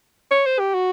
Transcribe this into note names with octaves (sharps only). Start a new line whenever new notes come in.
C#5
C5
G4
F#4